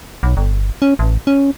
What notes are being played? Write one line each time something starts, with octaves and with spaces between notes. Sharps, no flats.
B1
G1
C#4
A1
C#4